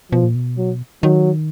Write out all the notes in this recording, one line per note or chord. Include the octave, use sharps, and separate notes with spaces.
B2 F3
A#2
B2
F#3
D#3 F#3